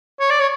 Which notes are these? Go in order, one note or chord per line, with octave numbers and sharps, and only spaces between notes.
C#5
D5
C#5